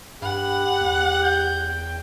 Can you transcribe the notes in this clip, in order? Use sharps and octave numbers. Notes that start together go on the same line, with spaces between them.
G2 G4 F#5 B5
E2
G6
G5